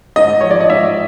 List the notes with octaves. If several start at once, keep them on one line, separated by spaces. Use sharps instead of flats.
G#2 D#5
F3 C#5
D5
D#5
G#2 E5